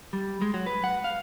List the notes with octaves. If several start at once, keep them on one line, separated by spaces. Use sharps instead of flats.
G3
G#3
F#3
B4
F#5
F5